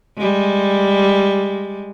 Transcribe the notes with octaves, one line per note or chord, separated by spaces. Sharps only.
G3 G#3